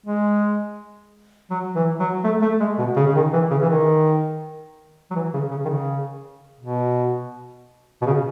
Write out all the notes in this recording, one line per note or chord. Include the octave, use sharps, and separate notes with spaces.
G#3
F#3
E3
F#3
A3
A3
G#3
B2
C#3
C#3
D#3
E3
C#3
E3
D#3
F#3
E3
C#3
C#3
D#3
C#3
B2
B2
C#3